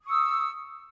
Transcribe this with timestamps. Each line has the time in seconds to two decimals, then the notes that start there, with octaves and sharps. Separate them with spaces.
0.02 D#6
0.06 C#6
0.11 E6